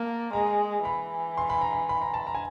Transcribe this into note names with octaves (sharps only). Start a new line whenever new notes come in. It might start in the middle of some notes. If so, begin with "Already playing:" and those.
Already playing: A#3 A5
G#3 A#5
E3 B5
C6
B5
A#5
B5
B5
A#5
A5
A#5
G#5